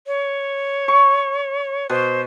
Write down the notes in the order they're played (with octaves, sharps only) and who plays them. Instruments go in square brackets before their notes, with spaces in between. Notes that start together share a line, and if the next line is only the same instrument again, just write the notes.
[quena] C#5
[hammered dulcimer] C#6
[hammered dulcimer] B2 [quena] C5